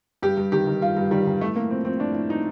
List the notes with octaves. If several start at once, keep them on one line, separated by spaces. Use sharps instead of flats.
G2 G4
G2
D#3 G4
D#3
G2 F4
G2
D#3 G3
D#3
A2 A3
A2 A#3
F3 C4
F3 C4
A2 D4
A2
F3 D#4